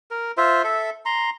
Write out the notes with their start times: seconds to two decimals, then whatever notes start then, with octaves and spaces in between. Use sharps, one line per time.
0.11 A#4
0.37 F4 C5 E5
0.64 A4 E5
1.05 A#5 C6